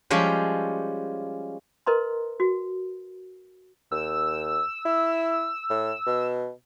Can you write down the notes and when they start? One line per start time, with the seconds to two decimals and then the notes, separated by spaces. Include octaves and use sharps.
0.10 F3 G3 G#3 C#4 G4
1.86 A#4 B4 D#5 A#5 C6
2.40 F#4
3.92 D#2 E6
4.85 E4
5.70 A2
6.07 B2